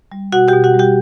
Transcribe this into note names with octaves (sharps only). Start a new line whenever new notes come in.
G3
B2 F#4 F#5
G4 G5
B2
F#4 F#5
G3
G4 G5